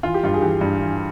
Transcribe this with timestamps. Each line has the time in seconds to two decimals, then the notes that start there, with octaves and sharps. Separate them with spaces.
0.03 E3 F4
0.14 G4
0.23 G2 F4
0.34 G#4
0.42 E3 G4
0.61 G2
0.81 E3